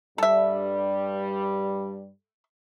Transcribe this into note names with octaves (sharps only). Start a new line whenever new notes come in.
G2 G3 A4 E5